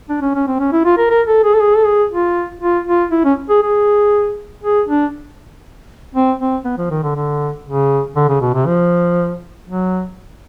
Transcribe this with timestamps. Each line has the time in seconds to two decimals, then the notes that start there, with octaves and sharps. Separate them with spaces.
0.09 D4
0.22 C#4
0.35 C#4
0.47 C4
0.59 C#4
0.72 E4
0.85 F4
0.98 A#4
1.10 A#4
1.27 A4
1.44 G#4
1.54 A4
1.60 G#4
1.77 A4
1.86 G#4
2.11 F4
2.62 F4
2.87 F4
3.11 E4
3.24 C#4
3.50 G#4
3.62 G#4
4.63 G#4
4.88 D4
6.15 C4
6.39 C4
6.65 B3
6.78 F3
6.90 D#3
7.03 D3
7.15 D3
7.66 C#3
8.16 D3
8.29 C#3
8.41 B2
8.54 C3
8.66 F3
9.68 F#3